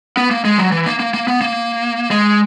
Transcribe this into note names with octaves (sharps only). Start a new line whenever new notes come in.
B3
A#3
G#3
F#3
E3
A#3
A#3
A#3
B3
A#3
G#3